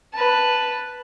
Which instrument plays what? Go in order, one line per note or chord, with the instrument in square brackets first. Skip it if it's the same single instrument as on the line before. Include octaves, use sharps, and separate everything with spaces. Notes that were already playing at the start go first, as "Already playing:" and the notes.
[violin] B4 A5